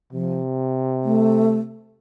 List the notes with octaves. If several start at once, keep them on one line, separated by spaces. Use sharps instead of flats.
C3 F3
A3